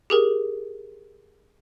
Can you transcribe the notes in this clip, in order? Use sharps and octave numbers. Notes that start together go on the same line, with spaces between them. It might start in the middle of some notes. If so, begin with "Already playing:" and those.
G4 G#4 A#4